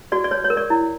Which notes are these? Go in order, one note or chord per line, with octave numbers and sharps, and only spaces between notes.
F#4 D5
D5
C#5
C#5
A#4
D5
E4